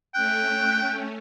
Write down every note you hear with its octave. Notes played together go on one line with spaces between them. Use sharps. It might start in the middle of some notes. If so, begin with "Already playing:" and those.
A3 C#4 G5 F#6